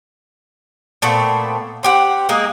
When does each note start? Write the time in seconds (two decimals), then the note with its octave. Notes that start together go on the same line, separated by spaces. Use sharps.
1.02 A#2 A3 B3 C4
1.83 C4 G4 F#5
2.29 G#3 A#3 D#4 G#4